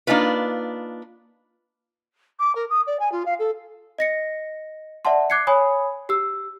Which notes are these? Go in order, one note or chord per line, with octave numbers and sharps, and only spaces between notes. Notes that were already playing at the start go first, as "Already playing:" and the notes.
A#3 D4 D#4 F4 B4
D6
A#4
D#6
D5
G#5
F4
F5
A4
D#5 A#6 C#7
D5 E5 F#5 A5 C6
D6 F#6 G#6 C7 C#7
C#5 G#5 B5 D#6
G4 E6